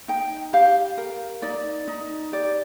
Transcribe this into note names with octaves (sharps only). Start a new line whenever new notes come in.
D#4 G5
G4 F5
A#4
D#4 D5
D#4
G4 D5